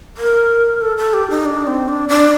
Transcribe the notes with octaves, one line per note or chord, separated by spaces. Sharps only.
A#4
A4
A4
G4
D#4
D4
C4
D4
D4